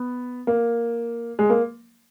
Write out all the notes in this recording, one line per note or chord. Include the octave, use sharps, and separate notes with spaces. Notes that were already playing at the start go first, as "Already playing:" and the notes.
Already playing: B3
A#3
G#3
A#3